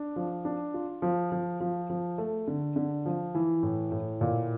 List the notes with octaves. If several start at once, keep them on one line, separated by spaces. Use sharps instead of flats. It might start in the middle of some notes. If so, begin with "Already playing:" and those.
Already playing: D4
F3
D4
F4
F3
F3
F3
F3
A3
D3
D3
F3
E3
A2
A2
A#2